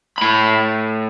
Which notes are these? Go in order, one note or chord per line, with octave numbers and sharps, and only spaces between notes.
A2 B5